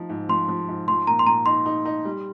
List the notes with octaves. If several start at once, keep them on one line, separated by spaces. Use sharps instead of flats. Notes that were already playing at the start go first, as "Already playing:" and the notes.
Already playing: F3 D#4
G#2
F3 C6
F3
G#2
F3 C6
A#2 A#5
C6
A#2 A#5
D#4 C6
D#4
D#4
G3